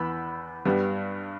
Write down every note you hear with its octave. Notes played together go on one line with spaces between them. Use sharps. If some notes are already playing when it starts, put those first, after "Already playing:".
Already playing: E2 E3 B3 B5 E6
G2 G3 B3